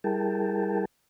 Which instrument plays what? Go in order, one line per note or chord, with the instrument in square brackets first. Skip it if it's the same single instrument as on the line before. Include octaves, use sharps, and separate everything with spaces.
[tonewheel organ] G3 E4 G#4 A#4 G5 A5